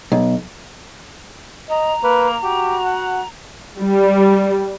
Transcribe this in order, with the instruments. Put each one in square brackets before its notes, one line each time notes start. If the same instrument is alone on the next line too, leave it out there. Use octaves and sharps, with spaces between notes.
[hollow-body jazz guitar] B1
[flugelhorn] D#5 [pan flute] A#5
[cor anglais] A#3 [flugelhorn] B4
[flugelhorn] F#4 [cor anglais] G4
[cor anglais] F#5
[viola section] G3